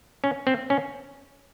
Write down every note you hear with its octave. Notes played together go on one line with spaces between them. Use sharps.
C#4
C4
C#4